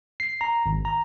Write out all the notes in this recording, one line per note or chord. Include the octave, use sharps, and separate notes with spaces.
C7
A#5
G#1
A#5